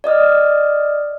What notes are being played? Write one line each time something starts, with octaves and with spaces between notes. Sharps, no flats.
D5 D#5 D#6 F6